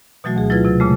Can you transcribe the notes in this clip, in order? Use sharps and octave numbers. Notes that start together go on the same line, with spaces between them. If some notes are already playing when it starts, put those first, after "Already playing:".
B2 E3 F#3 A3 F#4
D2 G#4
F#3 E4 F4 B4 G#6
C3 F#3
A#2 C#3 G#3 A3